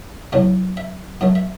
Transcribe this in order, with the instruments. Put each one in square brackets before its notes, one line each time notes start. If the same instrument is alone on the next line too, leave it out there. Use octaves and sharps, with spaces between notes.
[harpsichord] B1 A2 F#3 A3
E5
G#2 F#3 A3
E5